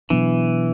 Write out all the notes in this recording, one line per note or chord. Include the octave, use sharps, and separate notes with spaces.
B2 E3 F#3 B3 D4